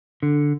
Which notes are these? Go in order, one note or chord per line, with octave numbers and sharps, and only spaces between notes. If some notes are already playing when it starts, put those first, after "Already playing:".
D3